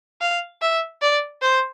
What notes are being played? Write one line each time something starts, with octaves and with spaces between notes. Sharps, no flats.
F5
E5
D5
C5